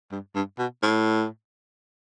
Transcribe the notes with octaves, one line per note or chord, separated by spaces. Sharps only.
G2
G2
B2
A2